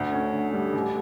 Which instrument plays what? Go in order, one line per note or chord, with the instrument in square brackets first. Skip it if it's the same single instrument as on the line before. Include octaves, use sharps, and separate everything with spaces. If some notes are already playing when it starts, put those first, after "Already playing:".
Already playing: [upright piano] D2 [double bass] A3
[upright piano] C#4
D3
G3
A1